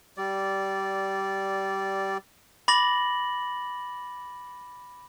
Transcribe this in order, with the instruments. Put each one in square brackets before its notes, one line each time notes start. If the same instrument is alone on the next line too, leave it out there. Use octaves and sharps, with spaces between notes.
[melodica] G3 D5
[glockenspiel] B5 D6 A6 A#6 F#7